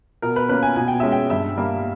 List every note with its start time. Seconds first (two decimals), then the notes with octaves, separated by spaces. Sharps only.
0.22 B2 A#4
0.36 B4
0.49 A#3 C#4 B4
0.63 G#5
0.76 B2 G#5
0.88 G5
1.00 G#3 C#4 E5
1.12 G5
1.30 G2 E5
1.57 G3 A#3